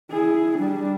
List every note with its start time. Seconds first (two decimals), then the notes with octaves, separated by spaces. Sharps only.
0.11 E4 G#4
0.57 G3 D4